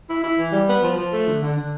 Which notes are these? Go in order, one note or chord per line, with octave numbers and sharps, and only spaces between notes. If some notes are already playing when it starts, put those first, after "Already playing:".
E4
E4
E3
G3
B3
F3
F3
A3
D3
D3
D3